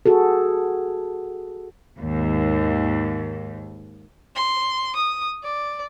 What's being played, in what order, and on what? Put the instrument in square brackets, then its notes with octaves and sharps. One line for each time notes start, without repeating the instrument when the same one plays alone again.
[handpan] F#4 G#4 A4
[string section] D#2 G#2
[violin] C6
D#6
D5